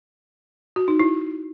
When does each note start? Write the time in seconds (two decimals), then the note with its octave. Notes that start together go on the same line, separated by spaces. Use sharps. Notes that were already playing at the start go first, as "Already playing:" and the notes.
0.76 F#4
0.88 D#4
0.99 E4